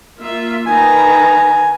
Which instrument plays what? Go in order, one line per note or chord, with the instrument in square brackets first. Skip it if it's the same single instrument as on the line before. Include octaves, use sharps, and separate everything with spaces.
[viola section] A#3 F4 E5
[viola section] D#3 B4 A#5 [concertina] G#5